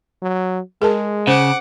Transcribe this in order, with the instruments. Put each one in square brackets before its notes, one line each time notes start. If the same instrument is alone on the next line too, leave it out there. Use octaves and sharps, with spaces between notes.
[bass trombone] F#3
[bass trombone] G#3 [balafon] G#4 A#4 A5
[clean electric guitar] C#3 [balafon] C5 [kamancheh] F#5 D6